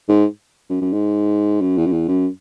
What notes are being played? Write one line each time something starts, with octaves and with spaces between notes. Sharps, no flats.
G#2
F#2
F#2
G#2
F#2
E2
F#2
E2
F#2